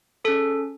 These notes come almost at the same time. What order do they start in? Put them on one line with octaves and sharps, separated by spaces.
G#4 A4 C#4